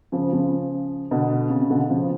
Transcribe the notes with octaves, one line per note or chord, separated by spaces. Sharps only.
C#3 F3
C#3 F3
B2 D3
C#3
C#3
B2 D3
C#3 F3